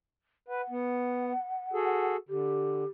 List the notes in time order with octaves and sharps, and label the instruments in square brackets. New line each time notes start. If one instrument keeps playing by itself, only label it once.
[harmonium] B4 [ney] F#5
[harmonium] B3
F#4 G#4 A4
[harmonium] D3 [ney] G4